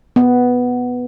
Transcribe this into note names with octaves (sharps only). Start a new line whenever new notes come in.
B3